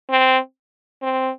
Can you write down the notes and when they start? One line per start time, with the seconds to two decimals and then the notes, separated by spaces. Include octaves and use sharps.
0.10 C4
1.02 C4